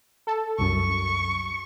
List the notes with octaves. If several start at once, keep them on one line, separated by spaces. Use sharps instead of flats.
A4
C2 F#2 C#6